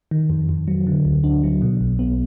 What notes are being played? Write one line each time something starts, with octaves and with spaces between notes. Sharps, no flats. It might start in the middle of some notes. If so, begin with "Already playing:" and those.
D#3
F2
F2
F#3
D3
D2
D4
F#3
B2
B1
B3